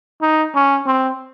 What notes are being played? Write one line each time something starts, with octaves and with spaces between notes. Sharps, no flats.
D#4
C#4
C4